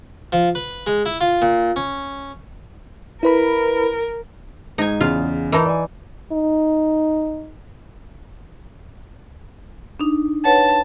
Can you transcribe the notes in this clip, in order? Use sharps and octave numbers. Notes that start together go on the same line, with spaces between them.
F3
B4
G#3
E4
F4
A#2
C#4
E4 A#4 B4 B5
G#2 D#4 G#5
E2 C#3 F4
E3 D#4 A#4 A5
D5 G#5
D#4
D4 D#4
B4 C#5 F#5 A5